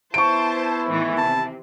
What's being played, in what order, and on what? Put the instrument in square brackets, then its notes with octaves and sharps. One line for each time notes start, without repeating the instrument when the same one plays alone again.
[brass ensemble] B3 E4 [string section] C5 A5 [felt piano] C#6 D7
[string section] A2 D#3 E3
[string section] C3 [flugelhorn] A5